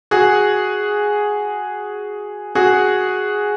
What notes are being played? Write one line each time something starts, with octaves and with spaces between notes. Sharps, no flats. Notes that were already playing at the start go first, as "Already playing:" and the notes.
F#4 G#4
F#4 G#4